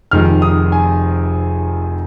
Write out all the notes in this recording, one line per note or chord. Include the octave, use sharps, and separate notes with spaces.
F1 F2 D#3 G#3 F6
D#6
G#5